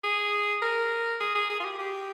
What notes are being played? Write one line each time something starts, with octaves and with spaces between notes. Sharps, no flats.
G#4
A#4
G#4
G#4
G#4
F4
G4
G4